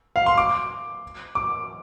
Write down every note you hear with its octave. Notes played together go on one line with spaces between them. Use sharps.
F5
C6
D6
D6